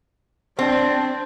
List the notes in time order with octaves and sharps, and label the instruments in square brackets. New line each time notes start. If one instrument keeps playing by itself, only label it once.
[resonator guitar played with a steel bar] C4 [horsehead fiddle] D4